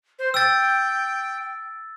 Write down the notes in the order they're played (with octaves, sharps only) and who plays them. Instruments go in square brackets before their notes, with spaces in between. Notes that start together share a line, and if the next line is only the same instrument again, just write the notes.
[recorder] C5
[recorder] G5 [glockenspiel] E6 A6